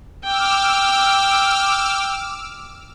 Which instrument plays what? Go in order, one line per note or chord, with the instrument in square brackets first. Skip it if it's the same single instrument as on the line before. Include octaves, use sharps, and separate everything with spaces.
[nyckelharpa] G5 [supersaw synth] D6 E6 F6